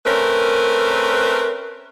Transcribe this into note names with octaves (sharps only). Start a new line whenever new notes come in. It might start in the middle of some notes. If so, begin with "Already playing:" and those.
A3 C4 C#4 A#4 B4